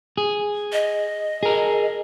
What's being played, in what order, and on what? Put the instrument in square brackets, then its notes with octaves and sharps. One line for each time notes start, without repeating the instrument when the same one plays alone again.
[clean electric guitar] G#4
[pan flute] D#5
[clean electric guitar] G#4 A#4